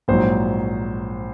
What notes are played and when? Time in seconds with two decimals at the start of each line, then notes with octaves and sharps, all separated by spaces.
0.08 A#1 G#2 F#3 C5